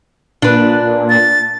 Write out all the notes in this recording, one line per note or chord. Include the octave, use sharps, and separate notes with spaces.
A#2 D4 B4
A6